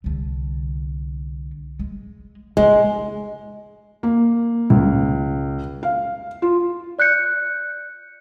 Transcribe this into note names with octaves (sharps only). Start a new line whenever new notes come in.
C2 D3
G#3
C#3 G#3 E4
A#3
C#2
F5
F4
D5 F#6 G6 C#7